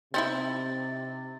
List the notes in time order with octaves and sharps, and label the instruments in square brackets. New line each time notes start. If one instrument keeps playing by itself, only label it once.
[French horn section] C3 [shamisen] C4 D#4 E4 [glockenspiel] A6